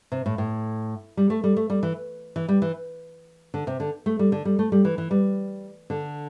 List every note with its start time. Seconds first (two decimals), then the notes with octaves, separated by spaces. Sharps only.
0.12 C3
0.26 A2
0.38 A2
1.17 G3
1.30 A3
1.44 G3
1.57 A3
1.70 G3
1.83 E3
2.36 E3
2.48 G3
2.62 E3
3.54 D3
3.67 C3
3.80 D3
4.06 A3
4.19 G3
4.32 D3
4.45 G3
4.59 A3
4.72 G3
4.85 E3
4.98 E3
5.11 G3
5.90 D3